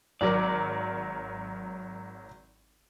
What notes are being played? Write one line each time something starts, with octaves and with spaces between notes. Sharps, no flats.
G#1 F#3 A#4 D5